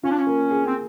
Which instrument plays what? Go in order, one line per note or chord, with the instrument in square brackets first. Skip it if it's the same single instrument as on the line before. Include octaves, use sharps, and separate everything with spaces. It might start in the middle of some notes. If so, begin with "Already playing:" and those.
[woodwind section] C#4 [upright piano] F4
[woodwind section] D4
C#4
[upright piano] A#3
G#4
[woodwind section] C4